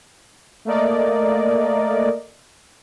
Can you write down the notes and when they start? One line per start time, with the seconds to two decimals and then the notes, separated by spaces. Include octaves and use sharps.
0.65 A3 A#3 A#4 D5 D#5